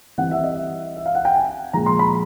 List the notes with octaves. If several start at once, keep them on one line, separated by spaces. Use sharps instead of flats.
E3 G3 C4 E4 F#5
E5
D#5
E5
E5
F5
F#5
G5
G#5
A#2 F3 G#3 A#5
C6
B5